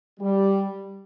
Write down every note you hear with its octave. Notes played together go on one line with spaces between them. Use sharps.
G3